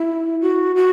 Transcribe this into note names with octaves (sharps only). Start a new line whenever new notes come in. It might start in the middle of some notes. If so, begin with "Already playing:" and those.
Already playing: E4
F#4
F#4